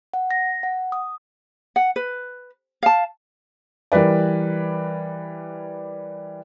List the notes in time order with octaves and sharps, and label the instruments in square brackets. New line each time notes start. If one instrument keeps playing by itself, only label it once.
[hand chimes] F#5
A#6
F#5
D#6
[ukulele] F#5
B4
F5 A5
[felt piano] E3 G3 A#4 B4 D5